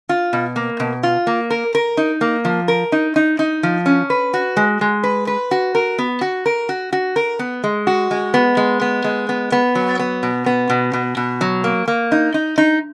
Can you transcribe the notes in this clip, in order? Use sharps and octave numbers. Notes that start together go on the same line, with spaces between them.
F4
B2
A#3
B2
F4
A#3
A#4
A#4
D#4
A#3
F3
A#4
D#4
D#4
D#4
F3
C#4
B4
F#4
G#3
G#3
B4
B4
F#4
A#4
B3
F#4
A#4
F#4
F#4
A#4
B3
G#3
F#4
G#3
B3
G#3
B3
G#3
B3
B3
F#3
B3
B2
B3
B2
B2
B2
F#3
A#3
A#3
D#4
D#4
D#4